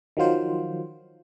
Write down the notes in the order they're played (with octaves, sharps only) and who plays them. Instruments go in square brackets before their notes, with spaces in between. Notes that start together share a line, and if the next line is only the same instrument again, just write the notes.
[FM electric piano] D#3 F3 F#3 F4 C5